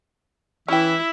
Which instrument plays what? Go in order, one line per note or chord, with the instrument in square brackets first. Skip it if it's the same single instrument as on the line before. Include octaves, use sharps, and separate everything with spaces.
[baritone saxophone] E3 [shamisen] C#4 G5 [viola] E4 [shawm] E5